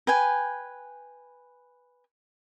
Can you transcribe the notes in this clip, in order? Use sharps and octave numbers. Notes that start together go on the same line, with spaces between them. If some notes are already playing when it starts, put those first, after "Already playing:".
B4 G5 G#5